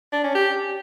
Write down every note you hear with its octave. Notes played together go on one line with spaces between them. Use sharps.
D4
C#4
G4